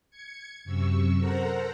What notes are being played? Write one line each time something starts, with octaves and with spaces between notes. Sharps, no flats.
G#6 C#7
F#2 C3 C#6 E6
A4 A#4 C5 F#5 A#5